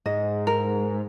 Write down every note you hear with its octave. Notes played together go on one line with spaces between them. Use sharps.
G#2 D#5
A#4